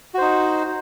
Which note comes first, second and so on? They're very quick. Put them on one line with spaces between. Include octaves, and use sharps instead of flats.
F#4 C5 D#4